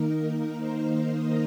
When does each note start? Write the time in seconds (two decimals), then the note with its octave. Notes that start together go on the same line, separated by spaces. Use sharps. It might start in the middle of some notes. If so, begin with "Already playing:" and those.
Already playing: D#3 A#3 D#4 A#4
0.58 C5
1.13 D#5